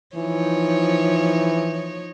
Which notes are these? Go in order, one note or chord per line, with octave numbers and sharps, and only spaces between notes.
E3 F3 D#4 C#5